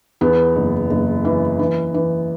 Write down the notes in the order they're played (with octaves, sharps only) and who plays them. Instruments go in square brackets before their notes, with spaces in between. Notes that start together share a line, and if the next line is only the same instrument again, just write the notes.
[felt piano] E2 B3
F#1
F#1
E3
E3
E3